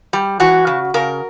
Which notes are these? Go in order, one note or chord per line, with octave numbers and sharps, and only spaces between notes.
G3
E3 F#4
C#3
C#3 A#4